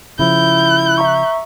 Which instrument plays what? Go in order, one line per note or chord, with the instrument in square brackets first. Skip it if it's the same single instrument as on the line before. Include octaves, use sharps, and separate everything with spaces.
[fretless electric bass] C#3 F3 [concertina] E4 [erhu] G6
[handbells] E5 A#5 C#6